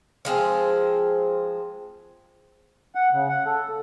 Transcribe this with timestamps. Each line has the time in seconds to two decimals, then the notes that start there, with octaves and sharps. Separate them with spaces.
0.25 F3 G#3 C4
2.95 F#5
3.13 C#3
3.29 F#5
3.46 A4